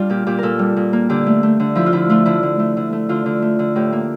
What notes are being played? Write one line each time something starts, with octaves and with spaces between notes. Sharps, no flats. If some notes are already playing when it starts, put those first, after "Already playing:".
Already playing: G3 D4 F4
A#2 G4
A#2 G4
A#2 A4 A#4
G3
A#2
A#3
D3 G4
A3
A3
D3
F3 E4
F4
D3 E4
A3 F4
D3 E4
D3
A3
D3
A3
D3 F4
D3
A3
D3
A2 G4
A#3